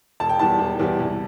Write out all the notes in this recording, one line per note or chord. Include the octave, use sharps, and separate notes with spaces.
E1 A5
G5
E2 E3 G3 A5
E1
E2 E3 G3
C2